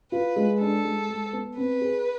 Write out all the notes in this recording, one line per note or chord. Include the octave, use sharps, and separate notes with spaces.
F4 B4
G#3
D4 A4
G#3
G#3
B3
C4 B4
G#4